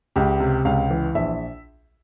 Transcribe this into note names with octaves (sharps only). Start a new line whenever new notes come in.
C#2 G4
C3
C#2 F5
E3
A#1 E5